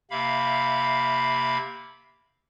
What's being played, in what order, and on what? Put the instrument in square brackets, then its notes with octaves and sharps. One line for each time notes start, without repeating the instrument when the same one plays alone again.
[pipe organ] C3 A#3 E5 F5 B5